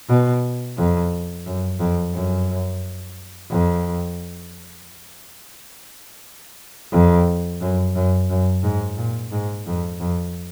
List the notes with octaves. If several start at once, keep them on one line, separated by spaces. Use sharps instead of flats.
B2
F2
F#2
F2
F#2
F2
F2
F#2
F#2
F#2
G#2
A#2
G#2
F2
F2